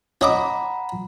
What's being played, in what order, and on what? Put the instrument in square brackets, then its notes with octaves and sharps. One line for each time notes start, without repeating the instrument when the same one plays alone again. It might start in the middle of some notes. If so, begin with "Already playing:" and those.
[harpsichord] C#4 D#5 D6 [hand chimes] F#5 A#5 B5